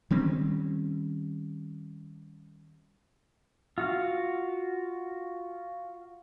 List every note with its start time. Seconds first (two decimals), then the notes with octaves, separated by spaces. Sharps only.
0.11 D#3 G3 C4 C#4
3.78 F4 F#4 F5